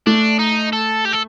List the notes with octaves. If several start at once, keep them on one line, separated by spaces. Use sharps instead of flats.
A3 D4
D#4
A4
G4
A4